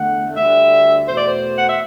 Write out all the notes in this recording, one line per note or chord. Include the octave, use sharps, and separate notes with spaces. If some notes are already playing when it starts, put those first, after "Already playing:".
Already playing: E2 D3 A3 F#5
D2 D3 G3 E5
E2 B2 A3 C5
D5
C5
F#5
E5